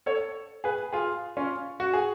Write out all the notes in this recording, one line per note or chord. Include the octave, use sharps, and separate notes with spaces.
A4 C#5
G#4 B4
F4 G#4
C#4 F4
F#4
G#4